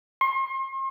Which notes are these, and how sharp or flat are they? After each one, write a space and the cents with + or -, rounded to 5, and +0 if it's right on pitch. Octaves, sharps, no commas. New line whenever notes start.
C6 +40